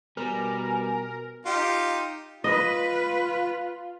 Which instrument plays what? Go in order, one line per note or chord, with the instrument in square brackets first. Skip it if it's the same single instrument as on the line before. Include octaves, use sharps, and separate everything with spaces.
[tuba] B2 [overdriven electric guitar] G3 [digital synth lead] A#4 [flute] G#5
[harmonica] D#4 F4 G4
[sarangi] F4 [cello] B4 [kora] D#5